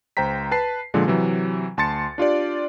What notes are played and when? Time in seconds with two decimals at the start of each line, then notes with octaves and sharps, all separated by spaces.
0.17 C#2 C5 G5 A#5 B6
0.51 B4 A5 C7
0.94 A#2 D3 F3 G#3
1.07 C3 E3 F#3
1.77 D2 A5 C6 A6 C#7
2.18 D4 F4 G4 D5